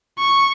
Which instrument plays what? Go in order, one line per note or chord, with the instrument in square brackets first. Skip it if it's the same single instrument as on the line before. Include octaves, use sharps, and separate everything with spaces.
[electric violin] C#6